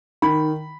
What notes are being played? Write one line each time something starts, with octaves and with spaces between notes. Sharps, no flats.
D#3 B5